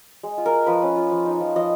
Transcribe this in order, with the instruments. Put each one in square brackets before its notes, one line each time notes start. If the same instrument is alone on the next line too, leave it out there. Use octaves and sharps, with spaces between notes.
[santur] G#3
F4
A#4
G#3
F3 B4
C#4
F4
F3
D#4
F3
F3 D#5